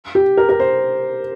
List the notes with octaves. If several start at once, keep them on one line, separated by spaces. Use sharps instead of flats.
G4
A#4
A#4
C5